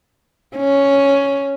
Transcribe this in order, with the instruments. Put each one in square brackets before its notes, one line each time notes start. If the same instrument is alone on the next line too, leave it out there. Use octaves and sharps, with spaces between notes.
[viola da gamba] C#4